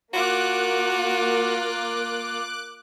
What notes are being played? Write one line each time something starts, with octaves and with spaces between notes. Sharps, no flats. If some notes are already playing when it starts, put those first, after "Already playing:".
A#3 F4 F#4 D6 F#6